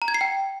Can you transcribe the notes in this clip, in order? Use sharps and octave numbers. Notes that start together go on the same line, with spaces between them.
A#5
G#6
C7
G5